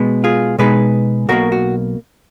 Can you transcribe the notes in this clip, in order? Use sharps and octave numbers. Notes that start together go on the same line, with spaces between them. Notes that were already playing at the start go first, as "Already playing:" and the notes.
Already playing: B2 G#3 B3
F4 G#4
B2 G#3 B3 D#4 G#4 B4
B1 B2 A#3 F#4 A#4
F#4